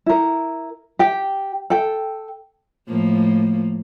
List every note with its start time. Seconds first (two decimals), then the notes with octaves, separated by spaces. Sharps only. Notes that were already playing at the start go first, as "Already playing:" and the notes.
0.06 E4 A#4
0.99 G4 G5
1.70 A4 G5
2.88 A2 F3 A#3